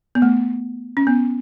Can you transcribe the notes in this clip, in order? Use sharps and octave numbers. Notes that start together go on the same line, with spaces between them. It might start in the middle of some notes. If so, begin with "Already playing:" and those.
B3
A3
C#4
B3